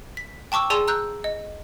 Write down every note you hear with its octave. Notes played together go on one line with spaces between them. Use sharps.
B6
G5 A5 C#6 D6 E6
G#4 D5 G#5 A5 C6 E6
A#5 E6 F#6 G6
D#5